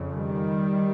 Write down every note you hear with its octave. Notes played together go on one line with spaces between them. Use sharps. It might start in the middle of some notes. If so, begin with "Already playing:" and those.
Already playing: F2 C#3
D#3 G3